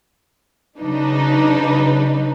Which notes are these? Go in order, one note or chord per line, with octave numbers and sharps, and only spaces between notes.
C#3 F#3 D4 D#4 B4